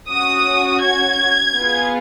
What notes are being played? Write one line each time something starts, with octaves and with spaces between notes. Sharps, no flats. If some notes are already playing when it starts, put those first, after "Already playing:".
C#4 F#4 D#6
G#6
B3 F4 G#4